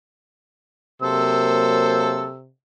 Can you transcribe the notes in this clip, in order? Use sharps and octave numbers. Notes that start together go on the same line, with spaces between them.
C3 F#3 A#3 A4 C5 E6